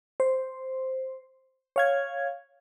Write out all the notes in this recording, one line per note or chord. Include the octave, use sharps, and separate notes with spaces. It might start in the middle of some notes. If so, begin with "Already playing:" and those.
C5
C#5 F5 G#6